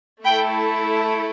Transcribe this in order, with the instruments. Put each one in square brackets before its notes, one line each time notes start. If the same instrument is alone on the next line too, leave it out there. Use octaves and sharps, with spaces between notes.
[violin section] A3 E4 A4 G5 B5